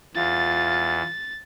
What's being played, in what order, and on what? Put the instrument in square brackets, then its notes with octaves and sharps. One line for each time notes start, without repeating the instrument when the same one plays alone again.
[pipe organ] E2 [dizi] F4 [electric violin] A6